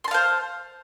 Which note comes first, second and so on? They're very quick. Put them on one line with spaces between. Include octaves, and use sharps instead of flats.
C6 A5 F5 C5